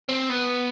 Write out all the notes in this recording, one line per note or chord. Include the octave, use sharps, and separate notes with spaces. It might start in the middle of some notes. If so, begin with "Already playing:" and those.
C4
B3